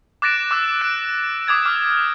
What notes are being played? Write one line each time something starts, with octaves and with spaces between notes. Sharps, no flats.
D6 F#6 A6 A#6 D7 E7
D6 E6 F#6
F#6 D7
D6 D#6 G#6 A6
D6 F6